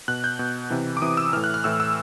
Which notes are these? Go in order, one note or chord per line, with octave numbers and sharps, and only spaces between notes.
B2 F#6
G6
B2
C3 E3
D6
C3 E3 D#6
E6
A2 E3 F6
F#6
F6
A2 E3 E6
E6